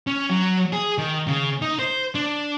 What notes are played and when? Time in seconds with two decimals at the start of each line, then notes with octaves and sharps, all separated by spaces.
0.07 C#4
0.30 F#3
0.72 G#4
0.98 D#3
1.27 C#3
1.62 D#4
1.79 C5
2.15 D4